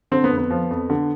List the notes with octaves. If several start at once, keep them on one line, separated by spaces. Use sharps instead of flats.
D3 C4
B3
F2
B3
F3
F2
D3